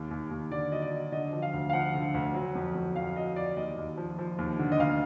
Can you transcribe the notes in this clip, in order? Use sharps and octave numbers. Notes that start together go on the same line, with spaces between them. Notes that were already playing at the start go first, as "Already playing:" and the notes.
Already playing: D#2
D#2
D#2
D3 D5
F#3 D#5
D5
F#3
D3 D#5
F3
F5
D2
F5
F3 F#5
D3
D2
F#3
F2
F2
F2 F5
F#3 D#5
F2 D5
D#2 D#5
D#2
F3
F3
D#2
D3
D#5
D2 F5